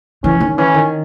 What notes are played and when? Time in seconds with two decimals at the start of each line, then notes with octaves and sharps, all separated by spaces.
0.24 E3 C#4
0.40 D#3
0.57 E3 C#4
0.74 D#3